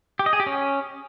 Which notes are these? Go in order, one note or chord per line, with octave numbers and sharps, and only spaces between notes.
G4
D#5
G#4
G4
C#4